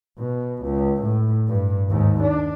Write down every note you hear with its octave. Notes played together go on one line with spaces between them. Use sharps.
B2
C#2
A2
G2
D#2 G#2
D4